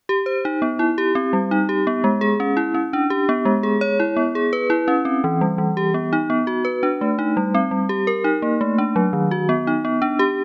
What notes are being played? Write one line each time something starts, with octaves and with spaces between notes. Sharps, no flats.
G4
C5
D#4
B3
E4
G4
C4
G3
D#4
G4
B3
G#3
G#4
C#4
E4
C#4
D4
G4
B3
G#3
G#4
C#5
E4
B3
G#4
B4
E4
C#4
C4
E3
G3
E3
G4
B3
D#4
B3
F#4
B4
D4
A3
D#4
G3
C4
G3
G4
A#4
D#4
A#3
A3
D4
F#3
D#3
F#4
B3
D#4
B3
D4
G4